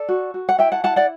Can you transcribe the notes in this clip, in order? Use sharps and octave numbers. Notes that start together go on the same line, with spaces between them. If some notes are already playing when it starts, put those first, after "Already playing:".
Already playing: A4 D5
F#4
F#4
F#5
E4 E5 G5
F#5 A5
E4 F#5 A5
D5 F#5